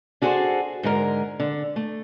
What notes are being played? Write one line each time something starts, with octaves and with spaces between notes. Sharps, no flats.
D4 F#4 G#4 A4 B4 C5
G#2 D3 G#3 A#4
D3
A3